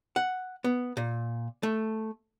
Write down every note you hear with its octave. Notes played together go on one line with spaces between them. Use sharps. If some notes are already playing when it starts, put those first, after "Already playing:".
F#5
B3
A#2
A3